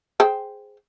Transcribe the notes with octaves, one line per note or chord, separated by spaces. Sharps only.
G#4 C5 G5